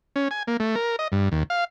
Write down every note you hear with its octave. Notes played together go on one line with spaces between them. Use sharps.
C#4
G#5
A#3
A3
A#4
D#5
G2
D#2
F5